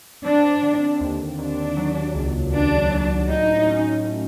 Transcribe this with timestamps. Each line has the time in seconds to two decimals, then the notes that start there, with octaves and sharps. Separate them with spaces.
0.24 C4 D4
0.63 D3
1.01 D#2
1.38 D#2 D4
1.77 F#3
2.15 C#2
2.53 C#2 D4
2.91 F#3
3.28 A2 D#4
3.67 C#4
4.05 A2